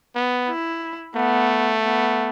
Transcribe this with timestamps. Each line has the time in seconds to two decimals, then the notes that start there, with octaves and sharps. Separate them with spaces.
0.16 B3
0.48 E4
1.16 A3 B3
1.84 B3